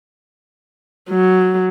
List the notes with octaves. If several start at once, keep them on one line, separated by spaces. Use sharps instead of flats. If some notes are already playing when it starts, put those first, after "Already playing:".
F#3